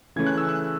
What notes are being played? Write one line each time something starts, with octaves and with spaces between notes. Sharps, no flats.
C#3 E3 A3 C#4 G#6
F#6
E6
F#6